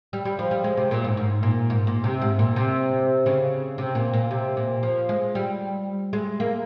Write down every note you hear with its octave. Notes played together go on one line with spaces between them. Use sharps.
G3
G3
F3
G3
G#3
C3
A#2
G#2
G#2
A#2
G#2
A#2
C3
G#2
A#2
C3
C#3
C3
A#2
A#2
C3
A#2
F3
G#3
G3
G#3
A#3